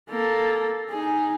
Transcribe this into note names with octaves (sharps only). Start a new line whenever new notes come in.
A#3 A4
D#4 G#4